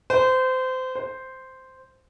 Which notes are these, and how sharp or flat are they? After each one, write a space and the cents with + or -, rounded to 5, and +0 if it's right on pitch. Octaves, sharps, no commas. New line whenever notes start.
C5 -25
C5 -5